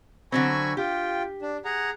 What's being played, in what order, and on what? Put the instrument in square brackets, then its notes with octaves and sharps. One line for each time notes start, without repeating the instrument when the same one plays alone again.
[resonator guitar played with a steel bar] D3 F#3 C4 [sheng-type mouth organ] G#5 B5 C#6
[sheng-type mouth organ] F4 G5 [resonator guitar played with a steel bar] G4
[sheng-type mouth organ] D4
G#4 F#5 A#5